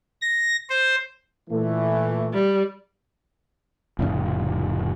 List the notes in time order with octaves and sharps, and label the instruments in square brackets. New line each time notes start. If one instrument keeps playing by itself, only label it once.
[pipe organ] A#6
C5
[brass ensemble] A#2 E3 A3
[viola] G3
[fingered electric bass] F1 A2 C#3